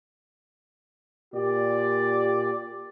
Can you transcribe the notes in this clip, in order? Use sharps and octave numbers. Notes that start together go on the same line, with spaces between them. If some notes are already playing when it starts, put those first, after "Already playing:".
A#2 G4 D5